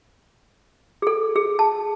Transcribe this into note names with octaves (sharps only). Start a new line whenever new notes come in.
G#4 A4
G#4
A5